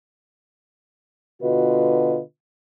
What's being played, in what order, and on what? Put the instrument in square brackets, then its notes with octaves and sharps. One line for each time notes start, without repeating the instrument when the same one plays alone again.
[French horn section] B2 D3 F4 F#4 B4 D#5